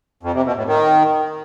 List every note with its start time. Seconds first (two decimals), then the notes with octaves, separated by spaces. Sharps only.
0.23 F2
0.34 C3
0.45 B2
0.56 A2
0.67 D#3